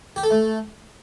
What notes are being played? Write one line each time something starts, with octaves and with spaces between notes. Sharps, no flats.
G4
A4
A3